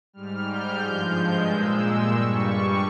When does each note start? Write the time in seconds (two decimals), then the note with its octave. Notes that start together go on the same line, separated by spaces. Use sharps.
0.13 G#2 G3 F6
0.47 G6
0.80 G2 F3 G#3
1.47 A#2 G#3 E6
2.13 G2 G3 C#6